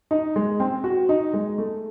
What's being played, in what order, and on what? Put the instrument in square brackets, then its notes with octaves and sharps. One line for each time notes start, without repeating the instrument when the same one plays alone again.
[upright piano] D#4
G#3
C4
F#4
D#4
G#3
A3